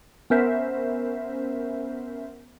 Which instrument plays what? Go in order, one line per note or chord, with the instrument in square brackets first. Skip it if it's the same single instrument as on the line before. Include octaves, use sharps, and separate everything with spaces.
[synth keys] B3 C#4 A#4 C5 E5